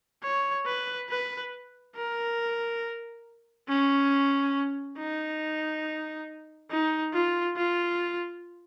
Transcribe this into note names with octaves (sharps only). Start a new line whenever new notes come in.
C#5
B4
B4
A#4
C#4
D#4
D#4
F4
F4